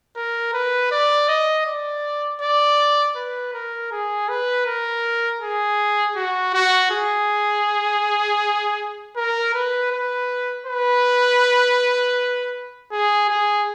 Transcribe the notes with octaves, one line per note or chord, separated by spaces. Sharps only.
A#4
B4
D5
D#5
D5
D5
B4
A#4
G#4
B4
A#4
G#4
F#4
F#4
G#4
A#4
B4
B4
B4
G#4
G#4